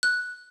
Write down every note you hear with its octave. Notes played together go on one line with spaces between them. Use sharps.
F#6